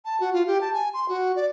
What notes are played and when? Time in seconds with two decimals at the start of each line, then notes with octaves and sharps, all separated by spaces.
0.05 A5
0.20 F#4
0.33 F4
0.47 G4
0.61 A5
0.74 G#5
0.94 C6
1.09 F#4
1.36 D5